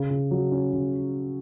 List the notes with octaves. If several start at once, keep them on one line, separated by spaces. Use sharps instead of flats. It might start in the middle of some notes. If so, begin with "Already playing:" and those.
Already playing: C#3
C#3
F#3
C#4
C#3